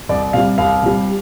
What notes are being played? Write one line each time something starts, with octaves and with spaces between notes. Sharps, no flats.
C2 D5
C3 G3 F5
C2 F5
C3 G3